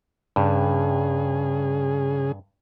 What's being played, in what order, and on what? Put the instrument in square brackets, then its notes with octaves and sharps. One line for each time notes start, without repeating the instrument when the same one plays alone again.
[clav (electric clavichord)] G2 [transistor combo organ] C#3 G#4